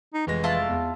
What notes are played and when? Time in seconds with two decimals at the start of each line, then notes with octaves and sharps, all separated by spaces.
0.14 D#4
0.27 F1 E3 G#3 A#6
0.44 E4 F4 A5
0.67 E2